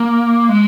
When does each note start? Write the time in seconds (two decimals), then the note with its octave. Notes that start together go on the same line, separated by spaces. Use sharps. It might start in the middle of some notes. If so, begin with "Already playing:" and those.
Already playing: A#3
0.49 G#3